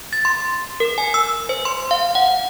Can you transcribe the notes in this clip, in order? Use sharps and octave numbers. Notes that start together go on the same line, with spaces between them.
A6
C6
A#4
G#5
E6
C5
C6
F5
F#5